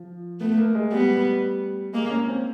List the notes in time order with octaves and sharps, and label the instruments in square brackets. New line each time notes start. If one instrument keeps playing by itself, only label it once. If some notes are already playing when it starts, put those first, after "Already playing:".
Already playing: [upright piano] F3
[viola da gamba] A3 [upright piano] B3
[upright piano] A#3
G#3
[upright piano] G3 [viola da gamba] B3
[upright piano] G#3 [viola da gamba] A#3
[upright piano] C#4
C4